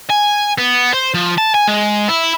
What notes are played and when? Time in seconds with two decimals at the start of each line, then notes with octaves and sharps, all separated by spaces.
0.10 G#5
0.58 B3
0.94 C5
1.14 F3
1.38 A5
1.54 G#5
1.68 G#3
2.09 E4